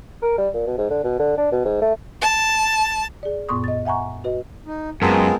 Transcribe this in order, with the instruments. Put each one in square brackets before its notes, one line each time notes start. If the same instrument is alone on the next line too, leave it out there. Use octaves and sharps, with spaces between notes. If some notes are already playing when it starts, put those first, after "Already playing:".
[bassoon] A#4
G3
A#2
B2
G#2
D3
B2
D3
D4
B2
G#2
A3
[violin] A5
[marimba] G#4 D5
F#2 A#2 B3 C6 C#6 D#6
D#5 A6
E5 F#5 G#5 A#5 C#6
F#4 B4 D#5
[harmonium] D#4
[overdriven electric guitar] F#2 [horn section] G#3 C4 [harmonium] B3 F4 G#4 [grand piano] A#4 A5